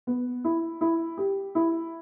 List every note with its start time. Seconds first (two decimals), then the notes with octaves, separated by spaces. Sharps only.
0.07 B3
0.44 E4
0.81 E4
1.18 G4
1.55 E4